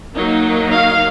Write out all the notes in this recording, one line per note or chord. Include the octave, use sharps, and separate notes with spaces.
F#3 A#3 D#4
F5